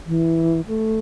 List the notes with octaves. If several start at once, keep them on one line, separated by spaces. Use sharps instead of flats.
E3
A3